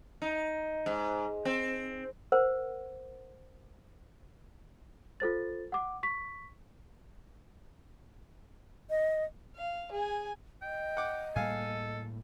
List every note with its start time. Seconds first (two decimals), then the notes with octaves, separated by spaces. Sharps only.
0.22 D#4
0.86 G#2
1.45 C4
2.32 A#4 C5 F#5
5.20 F4 A4 C5 A6
5.72 F#5 D6
6.03 C#6 B6
8.90 D#5
9.56 F5
9.92 G#4 G#5
10.62 D#5 G5
10.97 F#5 D6
11.36 A2 G3 A#3 A4 F5 G#5